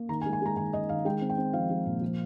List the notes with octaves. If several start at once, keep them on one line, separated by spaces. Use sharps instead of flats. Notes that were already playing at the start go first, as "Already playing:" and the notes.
Already playing: A#3
D#3 A#5
G#5
G#3
G#5
G#3 A#5
D#3 G#5
D#3 D#5
D#3 F5
G#3 G5
C4
G5
C4
F3 F5
G#3
A#2
F3